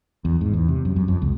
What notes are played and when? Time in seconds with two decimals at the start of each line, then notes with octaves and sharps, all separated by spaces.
0.25 E2
0.41 G#2
0.54 E2
0.68 C3
0.85 F#2
0.96 F#2
1.08 F2
1.22 C#2